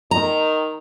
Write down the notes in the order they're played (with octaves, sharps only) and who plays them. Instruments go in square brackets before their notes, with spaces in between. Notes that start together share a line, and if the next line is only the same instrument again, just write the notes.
[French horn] D#3 [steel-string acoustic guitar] A#5